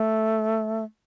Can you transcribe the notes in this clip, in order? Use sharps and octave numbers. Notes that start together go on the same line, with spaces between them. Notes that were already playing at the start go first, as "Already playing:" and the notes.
Already playing: A3